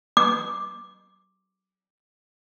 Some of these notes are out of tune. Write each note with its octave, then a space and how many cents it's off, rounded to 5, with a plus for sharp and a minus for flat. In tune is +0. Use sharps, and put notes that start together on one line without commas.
D6 +5